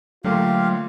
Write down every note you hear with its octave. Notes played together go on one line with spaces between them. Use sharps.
D3 F#3 A3 A#3 F4 G4 F5